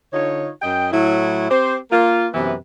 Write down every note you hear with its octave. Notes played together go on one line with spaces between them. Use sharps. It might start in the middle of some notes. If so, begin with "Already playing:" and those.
D3 D#4 F4 C#5
F#2 D#5 G5
A2 F#3 E4
C4 G4 C5
A#3 F4
F#2 C3 E3 B3 B4